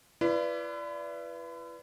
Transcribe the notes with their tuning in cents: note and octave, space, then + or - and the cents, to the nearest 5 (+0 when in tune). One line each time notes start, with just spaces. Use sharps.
E4 +40 B4 +0 D5 -5